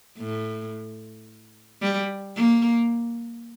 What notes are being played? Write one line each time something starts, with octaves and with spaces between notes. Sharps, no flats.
A2
G3
A#3